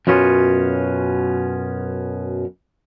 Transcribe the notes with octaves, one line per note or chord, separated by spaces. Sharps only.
F#2 B2 B3 C#4 F4